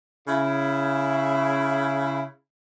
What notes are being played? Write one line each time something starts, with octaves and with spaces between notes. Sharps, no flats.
C#3 E4